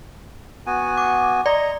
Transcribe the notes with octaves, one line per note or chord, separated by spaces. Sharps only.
B3 F#4 G#5
D6
D5 D#5 A#5